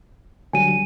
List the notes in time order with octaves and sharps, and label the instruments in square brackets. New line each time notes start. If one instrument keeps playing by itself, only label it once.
[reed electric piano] D3 F#3 G3 [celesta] G#5 D#7